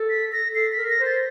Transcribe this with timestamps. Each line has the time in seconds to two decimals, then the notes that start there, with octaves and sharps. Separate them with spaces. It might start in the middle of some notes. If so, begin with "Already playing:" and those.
Already playing: A4
0.10 B6
0.32 A#6
0.55 A4 C7
0.72 B6
0.77 A#4
0.89 A#6
1.00 C5
1.06 A6